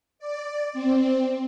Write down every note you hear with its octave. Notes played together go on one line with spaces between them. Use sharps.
D5
C4